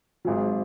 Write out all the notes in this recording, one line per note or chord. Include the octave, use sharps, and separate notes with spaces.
G#1 G#2 F#3